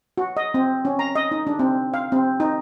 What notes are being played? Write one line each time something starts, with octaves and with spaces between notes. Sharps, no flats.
F#4
D#5
C4
C#4
A#5
D#5
D#4
D4
C4
F5
C4
D#4